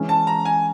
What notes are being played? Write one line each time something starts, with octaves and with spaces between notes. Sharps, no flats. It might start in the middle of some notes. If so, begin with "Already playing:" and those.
Already playing: E3 G#3 C#4
A5
A#5
G#5